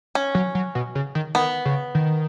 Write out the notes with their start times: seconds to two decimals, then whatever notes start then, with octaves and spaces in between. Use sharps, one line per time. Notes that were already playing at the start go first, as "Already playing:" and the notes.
0.15 C#4
0.35 F#3
0.55 F#3
0.75 B2
0.95 C#3
1.15 D#3
1.35 D#3 B3
1.65 C#3
1.95 D#3